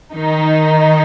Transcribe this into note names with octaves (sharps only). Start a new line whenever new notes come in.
D#3 D#4